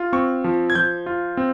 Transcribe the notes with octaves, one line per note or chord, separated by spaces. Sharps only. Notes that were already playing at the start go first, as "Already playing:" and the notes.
Already playing: F4
C4 C#6
F3
G#6
F3 G6
F4
C4